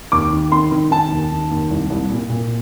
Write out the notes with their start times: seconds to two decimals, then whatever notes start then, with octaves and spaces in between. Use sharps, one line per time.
0.12 D#2 D6
0.32 D#3
0.52 D#3 C6
0.72 D#3
0.91 D#3 A5
1.12 D#2
1.32 D#3
1.51 D#2
1.70 C2
1.90 C2
2.11 A#2
2.30 A#2